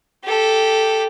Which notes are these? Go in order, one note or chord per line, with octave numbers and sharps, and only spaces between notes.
G4 A4